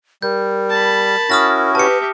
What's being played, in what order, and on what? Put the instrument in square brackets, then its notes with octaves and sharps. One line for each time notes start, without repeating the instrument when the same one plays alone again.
[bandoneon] G3 [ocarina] A#4 [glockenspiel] G6
[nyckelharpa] A5 B5
[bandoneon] C#4 E4 F#4 [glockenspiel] D#6 F6 A#6
[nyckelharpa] G4 E5 [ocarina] B4 [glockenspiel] A5 C#7